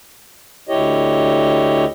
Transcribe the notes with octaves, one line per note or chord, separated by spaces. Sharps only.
D2 E4 G4 C#5 D#5